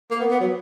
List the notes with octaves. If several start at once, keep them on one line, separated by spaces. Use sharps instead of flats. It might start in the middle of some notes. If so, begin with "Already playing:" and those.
A#3
B3
B3
F#3